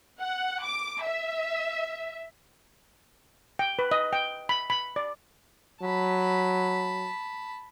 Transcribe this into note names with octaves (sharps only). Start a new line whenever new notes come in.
F#5
D6
E5
G5
B4
D#5
G5
B5
B5
D5
F#3 A5 B5